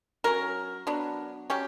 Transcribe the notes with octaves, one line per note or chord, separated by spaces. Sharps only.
F#3 C#4 A#4
F#3 B3 D4
F#3 C#4 G4